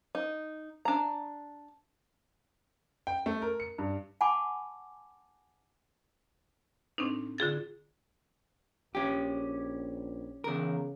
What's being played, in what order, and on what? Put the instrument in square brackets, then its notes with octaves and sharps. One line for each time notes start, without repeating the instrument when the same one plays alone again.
[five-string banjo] D#4
D4 A#5
[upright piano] G5
A3
A#4
C#7
G2
[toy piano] F#5 G#5 A5 B5 C#6 D6
[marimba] A2 C4 D4 D#4
D3 F4 G#4 A6
[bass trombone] A#1 [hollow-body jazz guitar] C#4 G4
[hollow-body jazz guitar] E2 A#4 [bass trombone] C#3